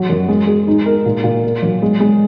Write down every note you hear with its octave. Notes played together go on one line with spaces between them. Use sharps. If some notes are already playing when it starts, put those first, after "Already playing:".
Already playing: F#3 F#4
F#2
G#3
G#4
D#4
A#4
A#2
A#2
A#4
F#3
G#3
G#3